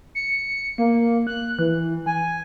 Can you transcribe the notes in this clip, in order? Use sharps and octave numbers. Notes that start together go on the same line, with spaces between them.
C#7
A#3
F#6
E3
G#5